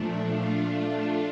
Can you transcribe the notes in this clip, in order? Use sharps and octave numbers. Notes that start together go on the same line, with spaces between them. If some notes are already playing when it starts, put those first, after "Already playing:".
Already playing: A#2 F3 A3 D4
A3 D4 F4